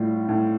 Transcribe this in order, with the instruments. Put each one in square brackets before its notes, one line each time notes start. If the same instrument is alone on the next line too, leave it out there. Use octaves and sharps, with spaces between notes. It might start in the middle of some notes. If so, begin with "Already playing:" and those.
Already playing: [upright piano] A2 G3 F4
A2